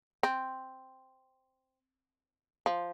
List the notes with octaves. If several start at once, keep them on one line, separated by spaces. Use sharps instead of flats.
C4
F3